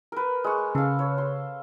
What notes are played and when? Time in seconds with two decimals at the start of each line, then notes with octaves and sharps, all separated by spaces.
0.12 A#4 B4
0.44 G#3 C#6
0.75 C#3 A4 F5
0.99 C#5
1.18 C6